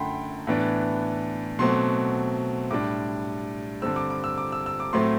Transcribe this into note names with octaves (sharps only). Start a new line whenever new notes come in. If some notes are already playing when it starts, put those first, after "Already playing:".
Already playing: F#2 D3 A3 F#5 G5 B5 C6
A2 E3 B3 D4
B2 F#3 A3 C4 C6
A2 G3 D4 D6
G2 D3 G3 C4 E6
D6
D6
E6
D6
E6
E6
D6
A2 F#3 A3 C4 C6